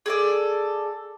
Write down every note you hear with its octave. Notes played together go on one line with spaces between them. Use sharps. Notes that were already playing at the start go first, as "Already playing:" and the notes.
G#4 A4 D5